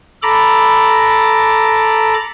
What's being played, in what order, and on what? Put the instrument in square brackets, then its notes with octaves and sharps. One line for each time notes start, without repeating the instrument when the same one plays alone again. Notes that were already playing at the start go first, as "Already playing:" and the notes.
[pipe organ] A4 A#5 B5 D6